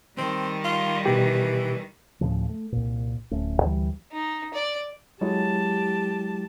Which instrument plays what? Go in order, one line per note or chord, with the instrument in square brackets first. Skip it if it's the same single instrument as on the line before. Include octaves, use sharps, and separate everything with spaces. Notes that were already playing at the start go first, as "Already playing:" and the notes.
[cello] D#3 G3 [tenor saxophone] C4
[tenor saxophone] F4
[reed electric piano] B2 G4 [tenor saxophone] E3
[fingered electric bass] D2 A2 C#3 F3
A3
C2 A#2
D1 A3 C#4
D2 E3 G3
[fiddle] D#4
D5
[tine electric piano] F#3 G#3 E4 [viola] G4 A5